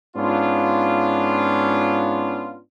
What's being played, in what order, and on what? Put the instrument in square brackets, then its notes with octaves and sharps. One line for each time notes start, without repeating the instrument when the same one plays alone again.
[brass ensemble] G#2 B3 C#4 D4 F4